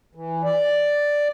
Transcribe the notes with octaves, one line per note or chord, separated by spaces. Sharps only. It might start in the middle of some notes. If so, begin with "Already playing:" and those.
E3
D5